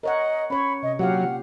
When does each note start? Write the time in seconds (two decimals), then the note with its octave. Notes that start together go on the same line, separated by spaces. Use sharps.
0.03 A#4 C#5 D#5 F#5
0.50 C#4 C#5 B5
0.83 C3 D#5
0.99 A#2 F#3 G4 F5 F#5